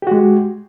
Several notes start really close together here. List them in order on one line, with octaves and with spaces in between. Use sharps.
G4 F#4 G#3